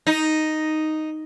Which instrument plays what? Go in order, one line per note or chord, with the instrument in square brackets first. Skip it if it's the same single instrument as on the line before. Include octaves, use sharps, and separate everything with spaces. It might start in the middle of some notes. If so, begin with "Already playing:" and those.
[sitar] D#4